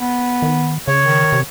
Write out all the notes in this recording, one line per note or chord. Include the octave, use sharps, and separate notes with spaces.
B3
D#3
C#3 C#5
D#3
C3